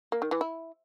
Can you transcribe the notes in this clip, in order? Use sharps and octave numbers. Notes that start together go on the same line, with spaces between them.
A#3
D#3
E3
E4